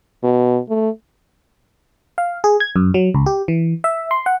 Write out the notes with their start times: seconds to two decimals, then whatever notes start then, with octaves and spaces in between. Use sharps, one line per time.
0.23 B2
0.69 A3
2.18 F5
2.44 G#4
2.60 G#6
2.76 F#2
2.94 F#3
3.14 C#2
3.26 G4
3.48 E3
3.84 E5
4.11 C6
4.26 F#5